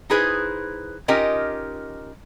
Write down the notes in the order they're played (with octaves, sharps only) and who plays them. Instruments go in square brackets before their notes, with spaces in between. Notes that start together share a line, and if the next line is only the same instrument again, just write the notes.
[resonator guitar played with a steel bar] D#4 E4 G#4 B4 C5
C#4 D#4 F4 G4 A#4 D#5